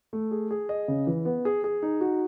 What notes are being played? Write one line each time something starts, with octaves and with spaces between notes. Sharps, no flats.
A3
G#4
G#4
D#5
C#3
E3
B3
G#4
G#4
D#4
F#4